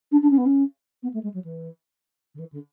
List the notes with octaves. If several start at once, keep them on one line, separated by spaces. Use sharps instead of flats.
D4
D4
C#4
B3
C#4
B3
A3
G#3
F#3
E3
D3
E3
D3